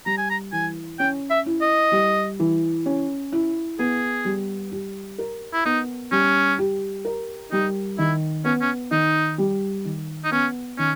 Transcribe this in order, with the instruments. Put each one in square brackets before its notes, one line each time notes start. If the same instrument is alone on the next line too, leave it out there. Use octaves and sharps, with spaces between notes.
[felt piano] G3 [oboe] A#5
[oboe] G#5
A#5
[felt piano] E3 [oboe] G#5
[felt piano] C#4 [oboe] G5
[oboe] E5
[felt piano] E4
[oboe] D#5
[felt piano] G3
E3
C#4
E4
[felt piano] B3 [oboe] G#4
[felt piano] G3
G4
A#4
[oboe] E4
[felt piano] B3 [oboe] D#4
[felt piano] G3 [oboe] C#4
[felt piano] G4
A#4
[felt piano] G3 [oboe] D#4
[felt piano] D#3 [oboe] E4
[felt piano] B3 [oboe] C#4
[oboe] C#4
[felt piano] D#3 [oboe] D#4
[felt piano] G3
D#3
[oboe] D#4
[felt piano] B3 [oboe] C#4
[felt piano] D#3 [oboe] C#4